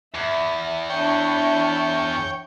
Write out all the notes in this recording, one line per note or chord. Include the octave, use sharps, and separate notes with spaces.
E2 E5
D4 E4 C#5 G5